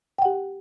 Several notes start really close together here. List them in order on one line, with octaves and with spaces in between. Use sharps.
G5 F#5 G4